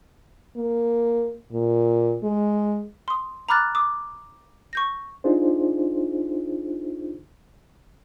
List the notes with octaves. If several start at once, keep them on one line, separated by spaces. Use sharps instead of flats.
A#3
A#2
G#3
C6 D#6
A#5 B5 D6 F6 F#6 A6
D6 D#6
C#6 G6 A#6
D4 D#4 F4 G#4 C5